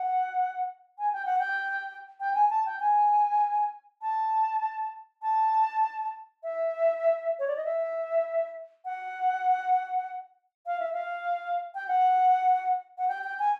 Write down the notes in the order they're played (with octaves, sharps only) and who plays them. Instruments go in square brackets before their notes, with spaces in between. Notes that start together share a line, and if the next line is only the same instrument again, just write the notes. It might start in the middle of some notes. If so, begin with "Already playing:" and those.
Already playing: [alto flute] F#5
G#5
G5
F#5
G5
G5
G#5
A5
G5
G#5
A5
A5
E5
C#5
D5
D#5
E5
F#5
F5
E5
F5
G5
F#5
F#5
G5
G5
G#5